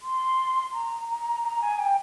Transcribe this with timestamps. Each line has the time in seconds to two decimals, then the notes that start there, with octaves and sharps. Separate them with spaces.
0.02 C6
0.73 A#5
1.09 A#5
1.43 A#5
1.61 G#5
1.78 G5